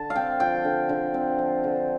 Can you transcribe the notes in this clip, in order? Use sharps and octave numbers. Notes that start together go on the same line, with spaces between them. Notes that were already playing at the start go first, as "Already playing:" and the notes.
Already playing: D3 A5
F5
C4 G5
F3 G5
D3
D3
C4
F3
D3